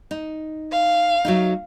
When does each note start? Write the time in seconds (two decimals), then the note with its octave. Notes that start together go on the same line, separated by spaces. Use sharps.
0.11 D#4
0.72 F5
1.25 F#3 A3 D#4